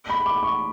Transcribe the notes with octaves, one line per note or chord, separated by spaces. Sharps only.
B5
D6
C#6